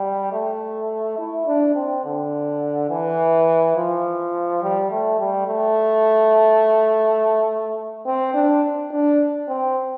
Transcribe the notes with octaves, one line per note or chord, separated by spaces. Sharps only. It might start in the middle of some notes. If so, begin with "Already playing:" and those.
Already playing: G3
A3
E4
D4
C4
D3
E3
F3
G3
A3
G3
A3
C4
D4
D4
C4